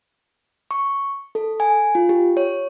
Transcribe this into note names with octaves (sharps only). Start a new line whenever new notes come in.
C#6
A4
G#5
F4
G4
C#5